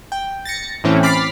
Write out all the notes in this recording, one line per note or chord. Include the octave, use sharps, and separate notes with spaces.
G5
A6 A#6 C#7
A2 E3 C4 C#4
B5 D6 F6 A6 B6 C7